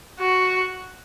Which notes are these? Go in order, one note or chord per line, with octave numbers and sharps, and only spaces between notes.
F#4